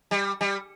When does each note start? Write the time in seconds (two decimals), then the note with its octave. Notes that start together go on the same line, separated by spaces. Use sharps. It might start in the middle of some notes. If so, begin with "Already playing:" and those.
0.11 G3
0.41 G3